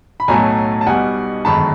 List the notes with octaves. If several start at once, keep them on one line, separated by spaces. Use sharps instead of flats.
B5
B1 A2 F#3 A3 G#5 A#5
A5
B1 B2 G3 F#5 G#5
G1 F#2 D#3 G#3 A5 B5